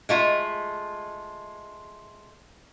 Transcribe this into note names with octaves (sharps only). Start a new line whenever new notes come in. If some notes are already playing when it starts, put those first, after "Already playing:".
G#3 A3 F4